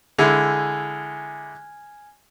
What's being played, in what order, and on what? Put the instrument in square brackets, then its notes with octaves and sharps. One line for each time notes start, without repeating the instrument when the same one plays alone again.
[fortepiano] D3 G#3 E4 [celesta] G#5 F6 G#6